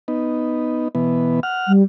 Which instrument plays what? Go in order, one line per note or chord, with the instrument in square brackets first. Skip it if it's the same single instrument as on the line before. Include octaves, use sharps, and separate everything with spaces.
[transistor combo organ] B3 D#4
B2 E3 B3
F#5 F6
[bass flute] G3